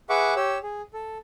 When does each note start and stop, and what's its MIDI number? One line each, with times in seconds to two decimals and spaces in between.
0.10 0.34 68
0.10 0.34 71
0.10 0.34 76
0.10 0.34 78
0.10 0.34 85
0.10 0.34 86
0.36 0.58 67
0.36 0.58 73
0.36 0.58 88
0.63 0.82 68
0.94 1.18 69